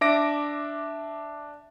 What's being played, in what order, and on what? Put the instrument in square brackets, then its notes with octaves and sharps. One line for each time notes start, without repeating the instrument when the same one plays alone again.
[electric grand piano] D4 E5 D6 A#6 D7